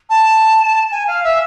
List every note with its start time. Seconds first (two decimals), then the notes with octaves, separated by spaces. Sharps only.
0.10 A5
0.91 G#5
1.07 F5
1.24 E5